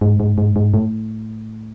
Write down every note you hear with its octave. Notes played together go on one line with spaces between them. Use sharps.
G#2
G#2
G#2
G#2
A2